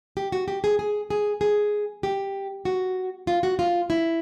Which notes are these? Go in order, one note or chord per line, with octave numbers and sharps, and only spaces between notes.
G4
F#4
G4
G#4
G#4
G#4
G#4
G4
F#4
F4
F#4
F4
E4